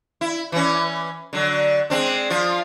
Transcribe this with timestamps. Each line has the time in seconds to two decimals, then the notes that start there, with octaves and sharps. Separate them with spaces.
0.21 E4
0.52 E3 C#4
1.33 D3 F#3
1.90 G#3 C4 D4
2.30 F3 F4